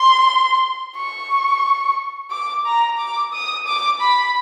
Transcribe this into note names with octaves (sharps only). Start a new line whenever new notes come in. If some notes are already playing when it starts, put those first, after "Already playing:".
Already playing: C6
C#6
D6
A#5
D6
D#6
D6
B5